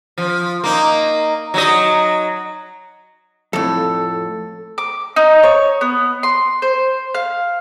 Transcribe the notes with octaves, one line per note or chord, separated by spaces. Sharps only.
F3
A#3 D#4
F#3 D#4 D#5
F2 A2 A4
D6
D#4
C#5
B3
C6
C5
F5